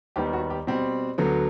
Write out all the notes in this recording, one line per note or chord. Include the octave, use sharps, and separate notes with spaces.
D#2 D#3 G3 B3 G4
F#4
G4
B2 G3 C4
D2 D3 F#3 B3